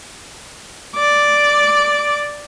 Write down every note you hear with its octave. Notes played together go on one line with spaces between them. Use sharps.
D5 D6